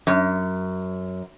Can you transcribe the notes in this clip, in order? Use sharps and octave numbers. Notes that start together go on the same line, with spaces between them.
F#2